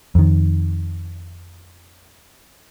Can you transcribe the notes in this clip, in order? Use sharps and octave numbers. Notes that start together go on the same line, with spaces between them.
F2 D#3